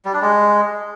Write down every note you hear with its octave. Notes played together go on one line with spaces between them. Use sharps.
G3
D4
G#3